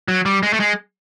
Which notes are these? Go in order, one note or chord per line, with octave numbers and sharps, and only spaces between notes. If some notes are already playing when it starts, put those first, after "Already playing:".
F#3
G3
G#3
A3
G#3